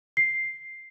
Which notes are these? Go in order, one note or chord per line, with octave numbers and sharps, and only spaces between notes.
C7